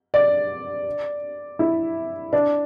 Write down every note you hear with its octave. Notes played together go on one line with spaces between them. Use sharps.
D5
E4
D4